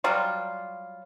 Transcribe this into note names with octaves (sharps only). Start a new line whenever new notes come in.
F#3 G3 F4